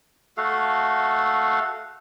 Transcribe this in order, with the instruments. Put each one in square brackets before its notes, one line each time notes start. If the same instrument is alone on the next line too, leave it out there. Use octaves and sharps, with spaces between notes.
[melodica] A3 F#4 A4 F5